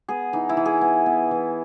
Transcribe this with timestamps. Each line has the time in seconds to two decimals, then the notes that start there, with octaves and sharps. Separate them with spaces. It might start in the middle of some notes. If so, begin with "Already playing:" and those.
0.08 B3 G#4
0.33 E3 D#4
0.49 E4
0.57 E3
0.66 G#4
0.81 B3
1.06 B3
1.31 E3